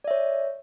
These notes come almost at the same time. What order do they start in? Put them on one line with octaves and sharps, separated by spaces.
D5 E5 C#5